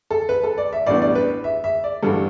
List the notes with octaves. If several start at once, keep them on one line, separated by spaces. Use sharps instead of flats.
A4
B4
A4
D5
E5
A1 A2 G3 B3 D4 D5
D5
B4
E5
E5
D5
A1 G2 G3 D4 A4